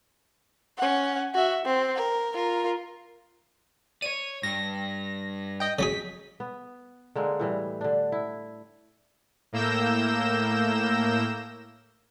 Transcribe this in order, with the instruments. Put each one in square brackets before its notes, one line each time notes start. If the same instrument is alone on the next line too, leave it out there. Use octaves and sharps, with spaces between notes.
[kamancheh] C#4 F#5
F#4 E5
C4
A#4
F4 A#4
[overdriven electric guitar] C#5 D5 [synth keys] D#7
[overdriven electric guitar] G2 [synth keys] A#6
[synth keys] D#5 G5
[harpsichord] C#3 F#3 G#4 [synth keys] B6
[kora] B3
D3 G#3 A#3 C4
A2 E3 G3
D3 D4
E4
[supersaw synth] A2 A#3 E6 G6 A#6 E7